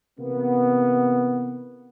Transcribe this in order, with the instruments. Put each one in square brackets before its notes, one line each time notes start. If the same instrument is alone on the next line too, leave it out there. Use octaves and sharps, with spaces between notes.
[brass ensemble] C3 E3 A#3 B3